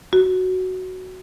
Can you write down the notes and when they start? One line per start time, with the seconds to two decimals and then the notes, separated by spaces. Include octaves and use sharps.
0.13 F#4